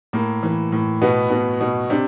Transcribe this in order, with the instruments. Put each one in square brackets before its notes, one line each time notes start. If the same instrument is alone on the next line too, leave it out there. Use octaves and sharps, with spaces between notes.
[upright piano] A2 A#3
E3
A2
B2 B3
B2
B2
C3 D4